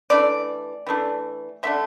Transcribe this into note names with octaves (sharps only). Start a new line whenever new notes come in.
E3 A3 D4 D5
E3 A3 D4
D3 A3 D4 E5